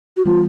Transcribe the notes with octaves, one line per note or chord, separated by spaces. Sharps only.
F#4
E3 G3 B3 F4